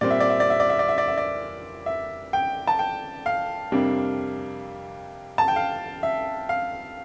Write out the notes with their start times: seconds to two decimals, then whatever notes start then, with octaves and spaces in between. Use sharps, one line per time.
0.01 A#2 G3 C4 D5
0.10 E5
0.20 D5
0.30 E5
0.40 D5
0.50 E5
0.60 D5
0.70 E5
0.79 D5
0.89 E5
0.98 D5
1.08 E5
1.17 D5
1.86 E5
2.33 G5
2.67 A5
2.79 G5
3.26 F5
3.72 F2 C3 G3 A#3 D4
5.38 A5
5.48 G5
5.56 F5
6.03 E5
6.49 F5